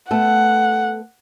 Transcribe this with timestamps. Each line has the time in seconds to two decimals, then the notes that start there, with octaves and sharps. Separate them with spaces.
0.11 A3 B3 A4 F#5